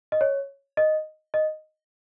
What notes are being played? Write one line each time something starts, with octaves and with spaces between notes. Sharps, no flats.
D#5
C#5
D#5
D#5